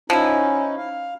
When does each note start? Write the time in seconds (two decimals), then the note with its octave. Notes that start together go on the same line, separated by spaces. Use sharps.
0.10 F3 C#4 D#4 E4
0.77 F5